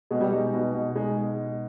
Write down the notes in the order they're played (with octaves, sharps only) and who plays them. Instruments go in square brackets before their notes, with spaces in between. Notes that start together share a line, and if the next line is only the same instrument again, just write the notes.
[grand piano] B2 [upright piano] G#3
[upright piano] G3
[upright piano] G#3 [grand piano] D#4
[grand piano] B2
B2
[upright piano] G#3 [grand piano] D#4